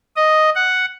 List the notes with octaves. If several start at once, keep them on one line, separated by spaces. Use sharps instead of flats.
D#5
F#5